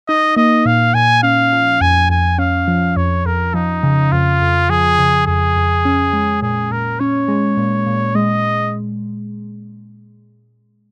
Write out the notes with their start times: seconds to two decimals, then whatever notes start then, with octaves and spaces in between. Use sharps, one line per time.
0.08 D#4 D#5
0.36 A#3 D#5
0.66 A#2 F5
0.94 A#2 G#5
1.23 C#4 F5
1.53 F3
1.81 F2 G#5
2.09 F2 G#5
2.38 C#4 F5
2.68 F3
2.96 F2 C#5
3.26 F2 A#4
3.54 F3 D#4
3.83 C#3
4.12 F2 F4
4.41 F2
4.69 F3 G#4
4.99 C#3
5.26 F2 G#4
5.56 F2
5.85 C#4
6.13 G#3
6.42 A#2 G#4
6.71 A#2 A#4
7.00 C#4 C#5
7.28 G#3
7.57 A#2
7.86 A#2
8.15 G#3 D#5